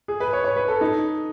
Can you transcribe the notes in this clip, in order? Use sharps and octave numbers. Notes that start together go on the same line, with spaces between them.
G#4
B4
C#5
C#5
B4
A4
D#4